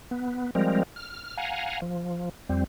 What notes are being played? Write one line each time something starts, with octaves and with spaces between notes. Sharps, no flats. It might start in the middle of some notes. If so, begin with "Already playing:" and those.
B3
F3 G3 G#3 C4 A#4
F6
F5 F#5 G#5 A#5
F3
F2 G3 C4